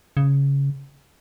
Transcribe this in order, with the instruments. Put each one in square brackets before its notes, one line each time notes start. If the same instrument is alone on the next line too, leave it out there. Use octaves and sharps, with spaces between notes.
[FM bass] C#3